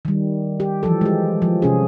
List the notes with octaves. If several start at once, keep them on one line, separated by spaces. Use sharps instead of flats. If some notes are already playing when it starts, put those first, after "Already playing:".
D#3 G3
G4
E3 F3 A4
G#3 G4
F3
C3 C#4 G#4